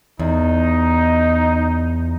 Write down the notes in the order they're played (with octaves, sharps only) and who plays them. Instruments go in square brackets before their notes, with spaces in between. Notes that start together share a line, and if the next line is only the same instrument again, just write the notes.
[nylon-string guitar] E2 [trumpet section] D#4